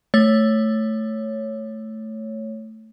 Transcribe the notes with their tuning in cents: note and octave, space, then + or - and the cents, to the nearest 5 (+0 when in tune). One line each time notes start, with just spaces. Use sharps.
A3 +0 C#5 +0